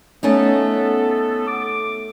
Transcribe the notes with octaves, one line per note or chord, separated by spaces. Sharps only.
A3 B3 C#4 D#4 A4
D6